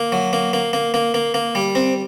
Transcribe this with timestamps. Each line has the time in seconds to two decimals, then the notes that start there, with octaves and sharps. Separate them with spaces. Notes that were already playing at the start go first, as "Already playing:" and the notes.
Already playing: A#3
0.12 F#3
0.33 A#3
0.53 A#3
0.73 A#3
0.94 A#3
1.14 A#3
1.34 A#3
1.55 G3
1.75 C4